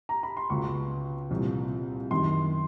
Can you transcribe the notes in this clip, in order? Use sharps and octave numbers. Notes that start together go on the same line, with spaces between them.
A#5
B5
C6
C#2 B2 C#6
C2 A#2 F3
F#2 D#3 C6